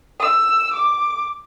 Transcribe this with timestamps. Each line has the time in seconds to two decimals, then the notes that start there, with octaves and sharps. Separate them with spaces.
0.20 E6
0.73 D6